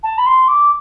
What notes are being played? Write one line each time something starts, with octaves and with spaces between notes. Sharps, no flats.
A5
B5
C6
D6